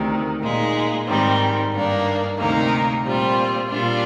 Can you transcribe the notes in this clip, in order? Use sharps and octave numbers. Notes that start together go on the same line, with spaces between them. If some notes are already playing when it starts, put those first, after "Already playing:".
Already playing: D2 C3 D#3
A#2 G#3 D#4
G#2 D#3 G3 C4
G2 D#3 A#3 D4
D2 C3 D#3 A#3 D#4
A#2 G3 C4 F4
A#2 G3 D4 F4